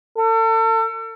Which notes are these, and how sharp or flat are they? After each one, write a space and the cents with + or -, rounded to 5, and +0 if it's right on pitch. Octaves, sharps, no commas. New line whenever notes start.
A4 +35